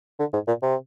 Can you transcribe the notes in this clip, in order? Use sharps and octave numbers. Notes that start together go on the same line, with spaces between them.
D3
G#2
A#2
C3